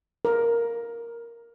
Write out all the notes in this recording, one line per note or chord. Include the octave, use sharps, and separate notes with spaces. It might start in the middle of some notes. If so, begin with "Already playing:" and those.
A#4